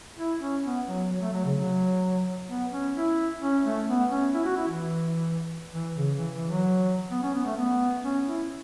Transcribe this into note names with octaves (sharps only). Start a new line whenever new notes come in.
E4
C#4
B3
F#3
F#3
A3
F#3
C#3
F#3
B3
C#4
E4
C#4
A3
B3
C#4
E4
F#4
E4
E3
E3
C#3
E3
E3
F#3
B3
C#4
B3
A3
B3
C#4
E4